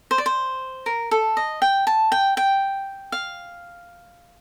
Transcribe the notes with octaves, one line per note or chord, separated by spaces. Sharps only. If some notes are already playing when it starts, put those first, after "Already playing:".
C5
D5
C5
A#4
A4
D#5
G5
A5
G5
G5
F5